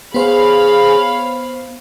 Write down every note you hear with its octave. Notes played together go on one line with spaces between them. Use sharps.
B3 G#4 C5 C#5 F5 B5